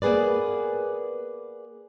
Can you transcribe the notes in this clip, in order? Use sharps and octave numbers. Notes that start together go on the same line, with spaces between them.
A#3 B3 G#4 B4 D5